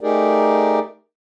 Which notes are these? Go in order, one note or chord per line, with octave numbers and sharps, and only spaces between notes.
A3 D#4 G4 G#4 A#4 D5